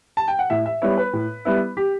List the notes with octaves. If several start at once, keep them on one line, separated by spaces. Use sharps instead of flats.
A5
G5
F#5
A2 E5
E5
G3 B3 E4 C#5
B4
A2
G3 B3 E4
G4